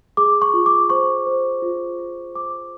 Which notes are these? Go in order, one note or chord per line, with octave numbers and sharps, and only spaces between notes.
G#4 D6
C#6
F4
D6
C5 C#6
C5
F4
F4
C5 D6